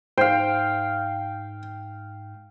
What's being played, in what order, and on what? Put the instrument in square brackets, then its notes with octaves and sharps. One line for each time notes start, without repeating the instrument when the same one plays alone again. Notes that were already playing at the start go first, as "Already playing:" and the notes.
[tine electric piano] G#2 [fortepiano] C5 [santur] F5 G5